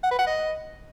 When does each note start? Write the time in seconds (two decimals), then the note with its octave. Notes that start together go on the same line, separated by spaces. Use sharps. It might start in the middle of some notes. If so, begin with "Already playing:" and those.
0.03 F#5
0.11 B4
0.19 F#5
0.27 D#5